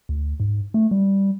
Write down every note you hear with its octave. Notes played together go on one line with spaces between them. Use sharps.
D2
G#2
A3
G3